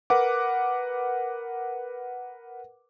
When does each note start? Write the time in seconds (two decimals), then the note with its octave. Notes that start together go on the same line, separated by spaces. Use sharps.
0.10 A#4 B4 F#5 D6